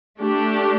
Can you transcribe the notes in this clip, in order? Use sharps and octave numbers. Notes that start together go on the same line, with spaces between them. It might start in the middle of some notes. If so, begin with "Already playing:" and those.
A3 D4 G4